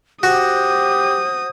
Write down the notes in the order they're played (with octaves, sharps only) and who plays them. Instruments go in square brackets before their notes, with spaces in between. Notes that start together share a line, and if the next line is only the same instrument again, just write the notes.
[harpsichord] F#4 [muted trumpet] G4 [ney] C5 [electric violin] D#6